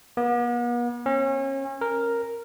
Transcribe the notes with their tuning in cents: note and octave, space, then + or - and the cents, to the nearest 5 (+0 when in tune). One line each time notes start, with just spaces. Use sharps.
B3 -45
C#4 -35
A#4 +0